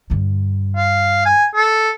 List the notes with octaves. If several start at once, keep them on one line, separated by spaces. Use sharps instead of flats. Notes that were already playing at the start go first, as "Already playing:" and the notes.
G2 D3
F5
G#5
A4